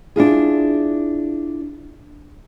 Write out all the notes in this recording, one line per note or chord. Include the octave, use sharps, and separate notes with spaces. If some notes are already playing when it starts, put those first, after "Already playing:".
D4 E4 F4 G#4